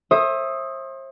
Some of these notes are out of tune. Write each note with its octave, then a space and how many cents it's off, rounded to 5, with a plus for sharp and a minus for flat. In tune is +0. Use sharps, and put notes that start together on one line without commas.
C5 +40 E5 +0 D#6 +0